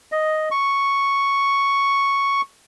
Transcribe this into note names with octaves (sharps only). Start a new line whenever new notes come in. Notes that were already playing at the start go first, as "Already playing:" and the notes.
D#5
C#6